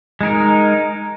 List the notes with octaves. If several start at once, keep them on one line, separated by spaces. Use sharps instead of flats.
G#3 D#4 A#4